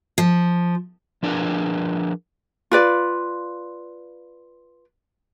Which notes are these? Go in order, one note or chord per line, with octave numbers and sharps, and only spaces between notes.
F3
F3 D4 G#4 A#4 B4
F4 B4 D5